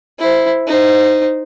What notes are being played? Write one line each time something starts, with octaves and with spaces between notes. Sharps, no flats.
E4 C5
D#4 C5